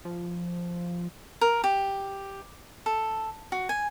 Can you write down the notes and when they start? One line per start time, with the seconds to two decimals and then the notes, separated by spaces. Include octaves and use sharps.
0.05 F3
1.41 A#4
1.64 G4
2.86 A4
3.52 F#4
3.69 G#5